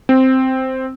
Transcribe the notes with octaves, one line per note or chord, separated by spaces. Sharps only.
C4